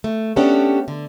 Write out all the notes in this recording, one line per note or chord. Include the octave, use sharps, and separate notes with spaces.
A3
B3 C#4 D4 F#4 G4 A4
D3